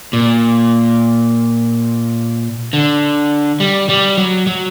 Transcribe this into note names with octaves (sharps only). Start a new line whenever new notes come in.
A#2
D3
G3
G3
F#3
F#3